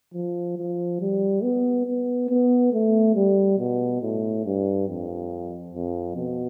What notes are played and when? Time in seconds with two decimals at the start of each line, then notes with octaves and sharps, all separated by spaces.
0.14 F3
0.57 F3
1.01 G3
1.43 B3
1.87 B3
2.29 B3
2.73 A3
3.15 G3
3.59 B2
4.02 A2
4.45 G2
4.88 F2
5.74 F2
6.17 B2